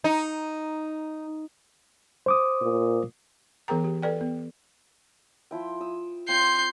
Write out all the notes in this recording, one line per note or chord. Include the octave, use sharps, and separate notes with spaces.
D#4
C5 D6 D#6
A#2
E3 B3 G#4 A#4 G5 A#5
G4
A4 B4 D5 G5
B3
F3 E4 G5
D#6 E6
C4 F4 G6 C7